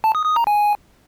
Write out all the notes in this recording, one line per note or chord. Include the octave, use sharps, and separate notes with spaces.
A5
D#6
D#6
A#5
G#5